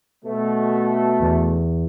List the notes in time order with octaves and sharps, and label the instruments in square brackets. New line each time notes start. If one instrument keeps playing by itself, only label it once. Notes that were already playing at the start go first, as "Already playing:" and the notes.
[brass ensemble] B2 A3
[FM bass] E2